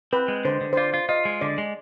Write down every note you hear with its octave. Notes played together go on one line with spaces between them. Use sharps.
C4 B4
G#3
D3 C5
D3
C5
F4 D5
F4
F4 D#5
G#3
D3 D5
G#3